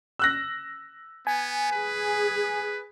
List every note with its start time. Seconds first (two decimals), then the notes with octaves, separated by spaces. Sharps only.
0.19 E6 F#6 A#6
1.27 B3 G#5
1.72 G#4 B4